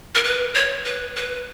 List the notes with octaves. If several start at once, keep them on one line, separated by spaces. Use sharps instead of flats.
A#4
B4
C#5
B4
B4